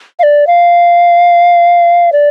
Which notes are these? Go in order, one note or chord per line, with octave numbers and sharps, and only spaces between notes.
F5
D5
F5
D5